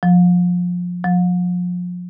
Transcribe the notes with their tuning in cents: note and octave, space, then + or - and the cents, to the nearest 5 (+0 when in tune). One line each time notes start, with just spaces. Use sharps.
F3 +25
F3 +35